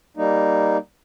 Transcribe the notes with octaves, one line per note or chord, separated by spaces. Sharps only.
G3 A#3 D#4